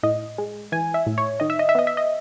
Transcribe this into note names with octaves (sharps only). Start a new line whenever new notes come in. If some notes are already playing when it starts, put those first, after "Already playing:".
A2 D#5
G#3
E3 G#5
E5
A2
C#5
D#3 D#5
E5
D#5
E5
B3 D#5
E5
D#5